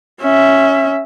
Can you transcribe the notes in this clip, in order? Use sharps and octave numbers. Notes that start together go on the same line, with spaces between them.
C#4 E5